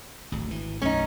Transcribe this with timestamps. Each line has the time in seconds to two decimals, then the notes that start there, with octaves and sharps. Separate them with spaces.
0.32 D1 G#1 D2
0.51 G#1 E3
0.82 B1 F#2 A3 C#4 D#4